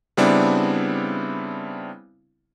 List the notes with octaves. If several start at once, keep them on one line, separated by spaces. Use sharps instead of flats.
C#3 G3 B3 C4 D4 E4